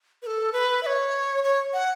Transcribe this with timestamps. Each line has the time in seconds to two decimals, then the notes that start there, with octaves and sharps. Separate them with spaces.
0.22 B4
0.27 A4
0.53 B4
0.83 E5
0.86 C#5
1.44 C#5
1.73 F#5